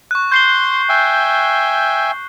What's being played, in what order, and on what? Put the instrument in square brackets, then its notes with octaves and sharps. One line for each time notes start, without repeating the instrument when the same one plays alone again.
[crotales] C#6 F#6
[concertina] C6 [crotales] G6 C7 G7
[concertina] E5 G5 G#5